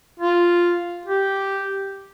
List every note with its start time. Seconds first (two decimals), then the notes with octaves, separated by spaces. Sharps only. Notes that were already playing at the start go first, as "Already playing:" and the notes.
0.19 F4
1.06 G4